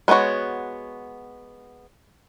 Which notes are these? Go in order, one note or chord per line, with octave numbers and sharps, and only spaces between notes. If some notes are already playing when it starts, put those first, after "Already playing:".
G#3 B3 C#4 F#4 C#5